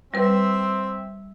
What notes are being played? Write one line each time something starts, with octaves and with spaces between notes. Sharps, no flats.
G3 C4 B4 E5